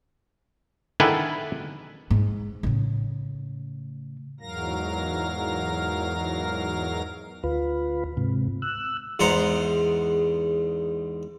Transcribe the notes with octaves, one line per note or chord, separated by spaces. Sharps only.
D3 D#3 E4 G#4 A4 B4
G#2
A2 C#3
E2 G#2 F#3 A#4 F5 A#6
D2 F4 B4
G#2 C3
E6 F#6
E2 G#2 C5 F#5 A#5